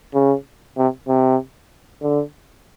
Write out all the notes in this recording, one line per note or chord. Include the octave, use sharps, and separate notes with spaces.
C#3
C3
C3
D3